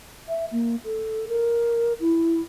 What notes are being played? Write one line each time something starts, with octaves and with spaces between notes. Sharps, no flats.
E5
A#3
A4
A#4
E4